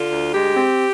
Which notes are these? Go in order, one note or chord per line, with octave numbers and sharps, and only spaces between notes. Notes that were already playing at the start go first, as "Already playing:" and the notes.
Already playing: D3 F4
D2
G#3 G4
C4